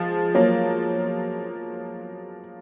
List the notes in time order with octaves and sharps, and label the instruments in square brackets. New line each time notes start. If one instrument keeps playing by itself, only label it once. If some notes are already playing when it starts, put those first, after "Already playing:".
Already playing: [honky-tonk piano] F3 G#3
F#3 A#3